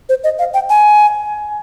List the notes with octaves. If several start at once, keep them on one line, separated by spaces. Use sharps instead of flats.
C5
D#5
F5
G5
G#5